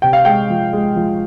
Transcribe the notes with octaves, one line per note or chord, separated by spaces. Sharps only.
C3 G5
F5
G#3 G5
F3
G#3
F3